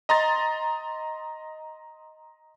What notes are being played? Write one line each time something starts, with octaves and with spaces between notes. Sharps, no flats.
D#5 A#5 C6 A6